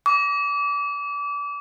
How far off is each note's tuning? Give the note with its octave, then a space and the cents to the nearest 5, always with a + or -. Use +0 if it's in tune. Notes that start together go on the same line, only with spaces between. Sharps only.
D6 -30